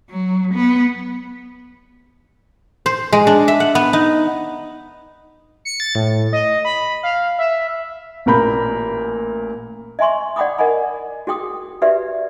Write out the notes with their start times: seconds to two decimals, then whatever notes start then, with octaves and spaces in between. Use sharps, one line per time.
0.10 F#3
0.54 B3
2.86 C5
3.12 G#3
3.27 D4
3.48 E5
3.60 F#5
3.75 B3
3.93 D#4
5.65 C#7
5.80 A6
5.95 A2
6.33 D#5
6.65 B5
7.03 F5
7.39 E5
8.26 A1 A#2 A#4 B5 G6
9.99 D#5 E5 G#5 C6 C#6
10.36 D5 F#5 G5 B5 D6 D#6
10.58 A#4 D#5 F#5 G#5 B5
11.27 F#4 G#4 G5 D#6
11.82 F#4 G4 B4 D5 E5